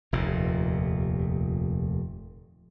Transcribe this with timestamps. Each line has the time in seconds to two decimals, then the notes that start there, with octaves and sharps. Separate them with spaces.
0.13 F1 D#2 A#2